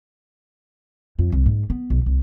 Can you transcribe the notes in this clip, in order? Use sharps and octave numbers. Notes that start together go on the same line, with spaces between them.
F2
C2
G#2
B3
B1
C2